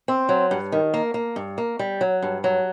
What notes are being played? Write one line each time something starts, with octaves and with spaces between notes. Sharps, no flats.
C4
F#3
G2
D#3
A#3
A#3
G2
A#3
G3
F#3
G2
F#3